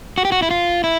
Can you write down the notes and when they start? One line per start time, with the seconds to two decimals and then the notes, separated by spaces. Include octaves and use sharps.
0.18 F#4
0.25 G4
0.32 F#4
0.42 E4
0.51 F4
0.84 E4